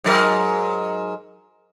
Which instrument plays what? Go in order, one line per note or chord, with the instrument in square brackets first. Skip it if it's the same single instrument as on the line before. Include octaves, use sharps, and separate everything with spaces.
[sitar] G#2 F#3 A#4